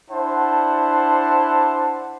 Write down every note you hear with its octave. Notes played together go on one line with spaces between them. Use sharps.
D4 E4 C5 F#5 A5